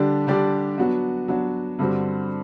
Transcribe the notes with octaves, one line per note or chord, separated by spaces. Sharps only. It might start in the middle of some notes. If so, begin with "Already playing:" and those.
Already playing: D3 G3 D4 G4 D5
D3 G3 D4 G4 D5
F#3 B3 D4 F#4
F#3 B3 D4 F#4
G2 D3 G3 C4 F#4